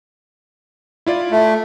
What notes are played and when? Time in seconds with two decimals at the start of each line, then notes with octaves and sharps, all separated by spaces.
1.06 E4 F4 D5
1.31 A3